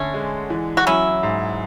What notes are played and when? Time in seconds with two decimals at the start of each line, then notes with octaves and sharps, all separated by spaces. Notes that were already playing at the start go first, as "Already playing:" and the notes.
Already playing: D3 A3 C#4
0.14 G#3
0.50 E3
0.77 F#4
0.87 F#3 C#4 E4
1.23 G#2